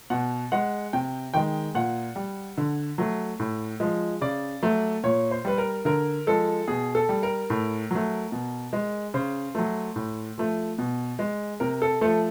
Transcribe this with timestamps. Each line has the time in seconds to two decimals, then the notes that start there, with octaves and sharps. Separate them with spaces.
0.10 B2 F#5
0.52 G#3 F#5
0.93 C3 G5
1.34 D#3 G#3 G5
1.75 A#2 F#5
2.16 G3
2.58 D3
2.98 F#3 A3
3.40 A2
3.80 F3 G#3
4.21 C#3 D5
4.63 F#3 A3
5.04 A#2 C#5
5.31 C5
5.45 G3 B4
5.58 A#4
5.85 D3 A#4
6.27 F3 G#3 A4
6.68 B2 G#4
6.95 A4
7.09 G3
7.23 A#4
7.50 A2
7.91 F#3 A3
8.32 B2
8.73 G#3
9.14 C#3 C5
9.55 F#3 A3
9.96 A2
10.38 F3 A3
10.78 B2
11.19 G#3
11.60 C3 A#4
11.82 A4
12.01 F3 A3 A4